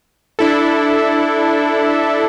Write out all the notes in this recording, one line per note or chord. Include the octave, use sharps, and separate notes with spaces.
D4 E4 A4